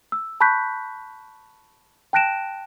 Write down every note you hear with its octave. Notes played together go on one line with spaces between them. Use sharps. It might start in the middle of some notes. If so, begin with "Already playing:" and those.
E6
A5 B5 C#6 F#6 G6 B6
G5 A5 F#6 A#6 D7 E7